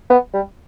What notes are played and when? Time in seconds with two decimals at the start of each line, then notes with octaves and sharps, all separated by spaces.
0.10 B3
0.33 G3